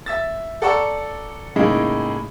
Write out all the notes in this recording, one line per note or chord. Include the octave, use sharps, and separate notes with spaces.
E5 E6 A6
A4 D5 F#5 A#5 C#6 E6
A2 C#3 G#3 A#3 D#4